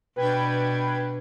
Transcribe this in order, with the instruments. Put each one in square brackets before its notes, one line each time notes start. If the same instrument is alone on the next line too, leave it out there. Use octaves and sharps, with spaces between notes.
[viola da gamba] B2 D4 [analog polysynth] B4 G5 G#6